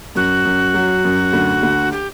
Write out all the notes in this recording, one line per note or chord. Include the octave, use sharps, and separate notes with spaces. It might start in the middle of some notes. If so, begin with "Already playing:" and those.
F#2 F#4
F#2
F#3
F#2
D2
D2
G4